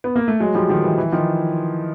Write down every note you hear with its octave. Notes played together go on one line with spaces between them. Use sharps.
B3
A#3
A3
F#3 G#3
F3 G3
D#3 F3
E3
E3
D#3 F3